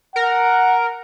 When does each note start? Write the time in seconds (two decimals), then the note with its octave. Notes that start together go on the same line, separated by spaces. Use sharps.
0.16 A#4 F#5